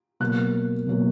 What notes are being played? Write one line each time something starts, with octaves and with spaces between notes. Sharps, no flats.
B2 F#3 A#3 F#6
B2 F#3 A#3